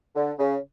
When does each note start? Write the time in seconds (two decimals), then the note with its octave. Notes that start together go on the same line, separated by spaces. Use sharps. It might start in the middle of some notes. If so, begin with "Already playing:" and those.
0.16 D3
0.39 C#3